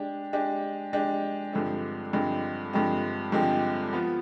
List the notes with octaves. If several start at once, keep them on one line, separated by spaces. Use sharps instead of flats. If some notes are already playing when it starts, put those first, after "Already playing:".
Already playing: G#3 D4 G4
G#3 D4 G4
G#3 D4 G4
G2 D3 F3 G#3 C4
G2 D3 F3 G#3 C4
G2 D3 F3 G#3 C4
G2 D3 F3 G#3 C4
F3 B3 F4